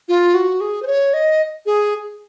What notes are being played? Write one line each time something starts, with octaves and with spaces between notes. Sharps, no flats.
F4
F#4
G#4
C5
C#5
D#5
G#4